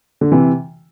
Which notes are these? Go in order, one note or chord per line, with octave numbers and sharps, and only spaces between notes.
D3
C3 E3